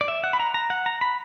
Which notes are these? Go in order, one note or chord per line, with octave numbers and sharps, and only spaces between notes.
D5
E5
F#5
B5
A#5
A#5
F#5
A#5
B5